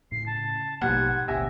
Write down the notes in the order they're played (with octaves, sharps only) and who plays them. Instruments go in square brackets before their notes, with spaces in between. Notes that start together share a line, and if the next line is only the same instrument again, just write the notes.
[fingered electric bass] A2 C#3 [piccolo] C7
[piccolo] A5
[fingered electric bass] A#1 B2 A#3 [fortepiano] G#2 G3 [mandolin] F#5 [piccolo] G#6
[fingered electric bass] A1 D2 B2 [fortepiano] G4 E5 G#5 [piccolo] A#6